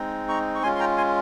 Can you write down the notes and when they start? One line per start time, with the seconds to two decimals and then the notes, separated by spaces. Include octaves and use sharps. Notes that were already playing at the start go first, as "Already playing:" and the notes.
Already playing: G#3 C4 D#4
0.29 A#5 C#6
0.55 C#6
0.63 G#3 C#4 F4 G#5 C6
0.75 C6
0.80 G5 A#5
0.97 G#5 C6